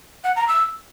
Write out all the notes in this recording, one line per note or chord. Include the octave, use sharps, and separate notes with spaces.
F#5
A#5
E6